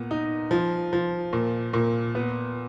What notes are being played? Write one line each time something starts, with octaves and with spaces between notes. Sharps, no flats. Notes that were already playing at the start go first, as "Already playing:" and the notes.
Already playing: A#2 B3
D#4
F3
F3
A#2
A#2
B3